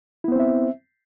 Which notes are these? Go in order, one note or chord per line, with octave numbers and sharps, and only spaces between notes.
B3 C4 E4 C5 E5